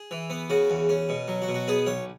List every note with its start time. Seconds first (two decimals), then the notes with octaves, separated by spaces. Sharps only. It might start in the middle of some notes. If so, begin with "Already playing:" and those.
Already playing: G#4
0.11 E3
0.30 B3
0.50 C#3 F#4
0.70 E2
0.89 C#4
1.09 B2
1.28 F#3
1.42 F#4
1.48 B2
1.54 F#4
1.68 B3 G#4
1.86 B1 C#5